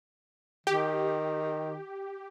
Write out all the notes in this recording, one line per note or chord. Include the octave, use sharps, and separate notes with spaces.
D#3 G4